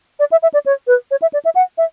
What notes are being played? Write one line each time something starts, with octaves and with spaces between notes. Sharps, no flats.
D5
E5
E5
D5
C#5
B4
C#5
E5
D5
E5
F#5
E5